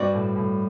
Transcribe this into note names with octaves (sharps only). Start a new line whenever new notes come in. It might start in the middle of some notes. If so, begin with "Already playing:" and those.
Already playing: G2 C4 F#4 B4 D5
A2
A2